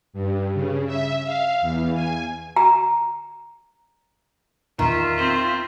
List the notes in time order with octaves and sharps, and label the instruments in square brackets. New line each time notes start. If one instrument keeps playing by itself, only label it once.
[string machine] G2
C#3
E5
F5
E2
G#5
[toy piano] A#5
[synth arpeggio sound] E2 A#2 [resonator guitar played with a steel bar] D#3 [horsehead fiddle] F4 E5
[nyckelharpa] C4